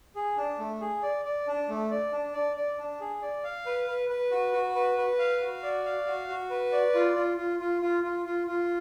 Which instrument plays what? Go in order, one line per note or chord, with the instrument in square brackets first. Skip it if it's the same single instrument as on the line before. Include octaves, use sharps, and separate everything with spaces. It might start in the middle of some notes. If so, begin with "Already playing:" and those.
[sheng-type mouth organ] G#4
D4
A3
G#4
D5
D5
D4
A3
D5
D4
D5
D5
D4
G#4
D5
F5
B4
B4
B4
F#4
F#4
B4
B4
F5
F#4
D5
F5
F#4
F#4
B4
D5
F4
F4
F4
F4
F4
F4
F4
F4